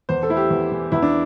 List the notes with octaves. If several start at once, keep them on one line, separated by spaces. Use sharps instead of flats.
E2 C5
A4
A3 E4
G4
E2
E3
E2 E4
D4